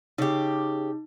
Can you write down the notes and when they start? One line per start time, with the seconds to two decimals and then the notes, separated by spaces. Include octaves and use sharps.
0.18 C#3 D#4 G4